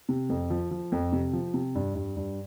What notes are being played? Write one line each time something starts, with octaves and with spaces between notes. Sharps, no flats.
C3
F2
F3
F3
F2
C3
F3
C3
G2
G2
G2